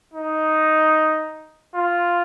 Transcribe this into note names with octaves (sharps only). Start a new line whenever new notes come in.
D#4
F4